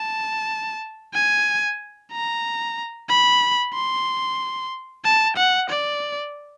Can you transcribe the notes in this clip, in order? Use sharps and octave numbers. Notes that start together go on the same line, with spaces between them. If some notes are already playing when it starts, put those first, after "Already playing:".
Already playing: A5
G#5
A#5
B5
C6
A5
F#5
D5